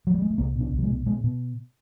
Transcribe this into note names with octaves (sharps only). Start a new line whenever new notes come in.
F#3
G3
G#3
A3
C2 A#3
B2
D4
C2
G3
G#3
B2
B2 G#3
B2